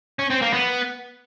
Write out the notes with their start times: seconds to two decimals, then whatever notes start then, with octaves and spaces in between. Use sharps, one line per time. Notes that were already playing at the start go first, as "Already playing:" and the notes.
0.19 C#4
0.30 C4
0.42 A#3
0.53 B3